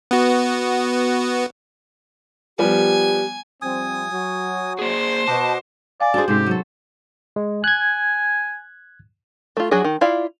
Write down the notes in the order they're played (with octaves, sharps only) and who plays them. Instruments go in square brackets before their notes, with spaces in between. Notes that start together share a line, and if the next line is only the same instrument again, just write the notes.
[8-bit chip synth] B3 F#4
[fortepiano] F3 G3 B3 [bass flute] G4 [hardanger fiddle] G#5
[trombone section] F3 G3 C4 [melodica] G#5 D#6
[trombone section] F#3 F#4
[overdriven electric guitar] A#3 G#4 [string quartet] C5
[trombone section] B2 [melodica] D#5 F#5 D6 [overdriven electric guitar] A5
[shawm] D5 [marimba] F5 G#5
[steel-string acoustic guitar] D4 G#4 [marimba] F#4 A6 [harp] A4 C5
[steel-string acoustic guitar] G#2 [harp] C3 C4 [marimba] C#4 D#4 G#4 [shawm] G4
[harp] F#3 A4
[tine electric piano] G#3
[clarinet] G#5 [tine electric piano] F#6 G#6
[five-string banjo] A3 F4
F#3 D4 F#4 G#4
D#3
E4 F4 D5 F5